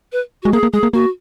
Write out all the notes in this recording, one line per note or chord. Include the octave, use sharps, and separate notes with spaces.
B4
F#4
G#3
A#3 G#4
A#3
G#3 G#4
A#3
A#3 F#4